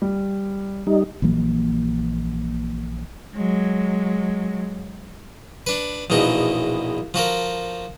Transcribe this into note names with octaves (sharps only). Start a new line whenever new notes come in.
G3
G3 D#4
A#1 E3 F#3 A#3
F#3 G#3
D4 B4
A#1 E2 B2 D#4 F#4
F3 F#4 A4 A#4